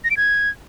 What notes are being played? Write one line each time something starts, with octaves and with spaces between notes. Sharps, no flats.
A#6
D7
G#6